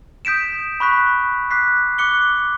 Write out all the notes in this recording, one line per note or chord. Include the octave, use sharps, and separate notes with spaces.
D#6 G6 B6 D7 E7
B5 C#6 F#6 B6
D6 F#6 B6 C7
D6 F#6 C#7 G7